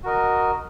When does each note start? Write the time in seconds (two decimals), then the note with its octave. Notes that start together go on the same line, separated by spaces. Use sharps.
0.03 F#4 A#4 D#5